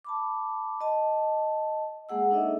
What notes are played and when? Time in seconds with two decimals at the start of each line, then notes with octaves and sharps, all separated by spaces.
0.05 A5 B5 D6
0.81 D#5 A5
2.09 G#3 A#3 G#4 F#5 E6
2.31 D4 D#4 A4 C#5 D#5 E5